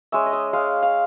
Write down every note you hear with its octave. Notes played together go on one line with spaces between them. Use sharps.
G#3 C#4 E5
D#5
E5
G#3 F5
F5